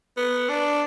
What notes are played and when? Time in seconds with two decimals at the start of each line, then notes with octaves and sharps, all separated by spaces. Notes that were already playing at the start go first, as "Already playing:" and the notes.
0.17 B3
0.49 D4